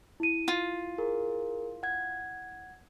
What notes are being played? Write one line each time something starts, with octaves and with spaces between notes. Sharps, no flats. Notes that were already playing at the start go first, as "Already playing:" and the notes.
E4 D#7
F4
G#4 A#4
F#5 G#6